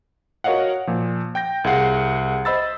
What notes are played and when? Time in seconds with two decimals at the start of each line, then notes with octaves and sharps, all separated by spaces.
0.44 F#4 A#4 C#5 D#5 F5 F#5
0.87 A#2 F3
1.35 G5 G6 A#6
1.64 C2 G#4 F5 F#5 C7
2.45 C5 D#5 B5 E6 A6